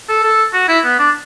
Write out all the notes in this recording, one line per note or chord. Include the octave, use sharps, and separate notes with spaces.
A4
A4
F#4
E4
B3
D4